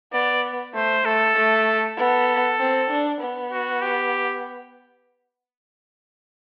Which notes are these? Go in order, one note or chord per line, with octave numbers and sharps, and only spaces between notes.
B3 D5
A3 C5
A3 A4
A3
B3 A4
C4
D4
B3
F#4
G4